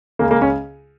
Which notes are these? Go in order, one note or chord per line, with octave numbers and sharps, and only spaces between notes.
C#2 C#3 A#3
A#3
C#4